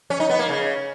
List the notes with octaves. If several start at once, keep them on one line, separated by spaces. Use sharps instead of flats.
C#4
D#4
B3
A#3
C#3